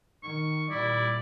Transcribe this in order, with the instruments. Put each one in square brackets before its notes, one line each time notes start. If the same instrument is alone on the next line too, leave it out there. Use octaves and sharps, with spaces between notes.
[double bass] D#3 [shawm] C#6
[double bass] A#2 G3 [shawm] E4 [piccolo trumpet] D5